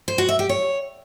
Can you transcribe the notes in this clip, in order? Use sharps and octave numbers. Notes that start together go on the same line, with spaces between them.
C5
F#4
E5
G4
C#5